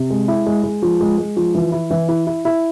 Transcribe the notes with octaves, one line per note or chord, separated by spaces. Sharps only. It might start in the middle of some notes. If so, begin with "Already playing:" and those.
Already playing: C3
G#3
E4
G#3
G#3
F3
G#3
G#3
F3
E3
E4
E3
E4
E4
E4